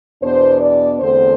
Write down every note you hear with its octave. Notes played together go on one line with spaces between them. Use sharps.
E2 B2 B3 D4 C5
D5
E2 D3 A3 C4 C5